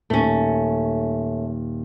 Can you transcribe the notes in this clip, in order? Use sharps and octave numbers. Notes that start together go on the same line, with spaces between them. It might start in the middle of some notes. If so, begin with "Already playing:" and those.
D#1 A3 C#4